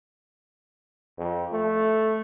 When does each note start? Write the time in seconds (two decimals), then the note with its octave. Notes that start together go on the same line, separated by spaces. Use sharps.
1.18 F2
1.53 A3